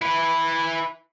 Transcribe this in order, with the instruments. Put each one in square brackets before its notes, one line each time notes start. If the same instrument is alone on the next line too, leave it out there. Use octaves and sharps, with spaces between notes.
[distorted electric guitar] E4 B4